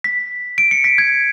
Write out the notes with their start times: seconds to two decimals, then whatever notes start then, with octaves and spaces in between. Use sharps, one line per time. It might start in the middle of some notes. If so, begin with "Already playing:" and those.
0.04 B6
0.58 D7
0.71 C#7
0.84 B6
0.98 G#6